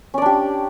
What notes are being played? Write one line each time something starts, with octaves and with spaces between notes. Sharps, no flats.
C#4 D4 G4 D5